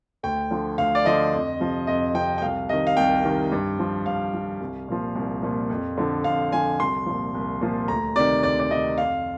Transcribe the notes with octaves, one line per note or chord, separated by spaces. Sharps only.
D2 G5
D3 F3
D2 F5
D5
D3 F3 D#5
F2
C3 F3
F2 D#5
C3 F3 G5
G5
C2 F5
C3 D#3 D#5
F5
C2 G5
C3 D#3
G2
F3
G2 F5
F3
C2
A#2 F3
C2
A#2 F3
F2
D3 F3
F2 F5
D3 F3 G#5
C2 C6
A#2 F3
C2
A#2 F3
D2 A#5
C3 D#3 D5
D2 D5
D5
C3 D#3 D#5
F2 F5